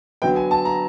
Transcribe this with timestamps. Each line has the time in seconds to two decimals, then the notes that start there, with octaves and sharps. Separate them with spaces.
0.22 D3 F#3 B3 G5
0.36 G#5
0.51 A5
0.65 A#5